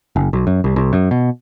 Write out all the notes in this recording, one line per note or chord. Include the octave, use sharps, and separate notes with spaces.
F#1
B1
F#2
C2
C2
F#2
B2